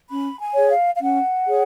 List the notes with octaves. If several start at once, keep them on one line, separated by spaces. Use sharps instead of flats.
C#4 B5
G#5
G#4 C#5
F5
F5
C#4 F#5
G#4 C#5